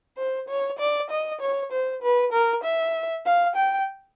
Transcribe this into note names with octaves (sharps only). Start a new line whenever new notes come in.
C5
C#5
D5
D#5
C#5
C5
B4
A#4
E5
F5
G5